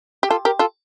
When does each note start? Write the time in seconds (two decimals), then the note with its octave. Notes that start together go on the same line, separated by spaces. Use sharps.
0.23 G4
0.30 F4 A4
0.45 G4 A#4
0.59 F4 A4